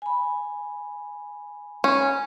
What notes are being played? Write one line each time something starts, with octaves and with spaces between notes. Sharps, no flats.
G#5 B5
C#4